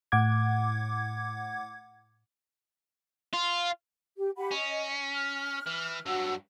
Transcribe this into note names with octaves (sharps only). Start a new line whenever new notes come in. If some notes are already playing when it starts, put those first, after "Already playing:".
A2 F#5 D6 G#6
F4
G4
G4 F#5 B5
C#4 D#5
F6
E3
G2 F#3 F#4 F#5 E6